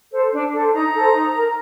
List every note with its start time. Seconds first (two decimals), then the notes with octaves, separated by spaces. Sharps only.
0.11 A4 C5
0.32 D4
0.52 A4 C5
0.73 D#4 A#5
0.93 A4 C5
1.13 D#4
1.33 A#4